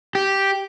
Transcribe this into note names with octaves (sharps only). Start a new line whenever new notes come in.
G4